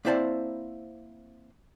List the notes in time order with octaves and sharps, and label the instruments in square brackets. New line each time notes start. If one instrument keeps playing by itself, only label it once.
[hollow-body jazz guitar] A#3 C4 E4 C5 D5 A5